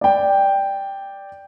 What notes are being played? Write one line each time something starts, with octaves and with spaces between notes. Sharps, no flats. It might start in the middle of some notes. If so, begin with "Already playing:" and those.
D5 G5